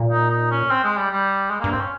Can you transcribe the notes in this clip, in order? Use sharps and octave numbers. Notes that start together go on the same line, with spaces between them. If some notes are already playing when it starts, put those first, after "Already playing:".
Already playing: A#2
D#4
D#4
C#4
C4
G#3
G3
G3
G#3
G2 A#3
C4
C#4